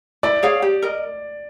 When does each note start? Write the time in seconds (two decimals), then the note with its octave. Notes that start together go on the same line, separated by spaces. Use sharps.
0.23 E4 D5
0.43 G#4 C#5 F5
0.62 G4
0.82 A#4 D#5